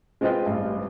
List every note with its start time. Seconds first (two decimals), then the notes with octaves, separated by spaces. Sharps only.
0.21 G#3 C4 F4 B4 D#5 G5
0.46 A1 G2